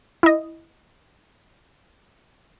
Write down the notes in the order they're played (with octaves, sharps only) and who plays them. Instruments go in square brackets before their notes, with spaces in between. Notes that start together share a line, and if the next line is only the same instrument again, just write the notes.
[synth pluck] E4 D#5